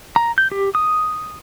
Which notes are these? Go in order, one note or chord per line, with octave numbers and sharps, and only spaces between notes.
A#5
G6
G4
D#6